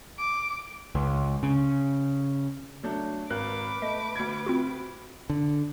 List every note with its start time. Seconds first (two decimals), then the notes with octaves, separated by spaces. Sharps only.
0.18 D6
0.95 C#2
1.43 C#3
2.83 F#3 A3 D4
3.30 G#1 A#4 B4 D6 F#6
3.82 A3 D#5
4.16 D2 G#6
4.46 C4 F4 F#4
5.30 D3